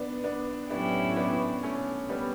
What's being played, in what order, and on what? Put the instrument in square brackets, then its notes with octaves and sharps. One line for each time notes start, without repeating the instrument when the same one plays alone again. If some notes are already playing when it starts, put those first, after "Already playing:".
Already playing: [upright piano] B3 D4
B3 D4
[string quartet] A2 F#3 C#4 E4 G4 [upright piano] B3 D4
[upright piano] B3 D4
A3 C#4
G3 B3